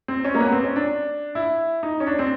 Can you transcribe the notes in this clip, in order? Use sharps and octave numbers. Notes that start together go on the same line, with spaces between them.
C4
C#4
A#3
B3
C4
C#4
D4
E4
D#4
C#4
D4
C4